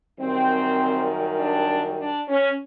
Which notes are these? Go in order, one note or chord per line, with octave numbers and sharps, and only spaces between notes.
F#2 D#3 G3 C4
D4
D4
C#4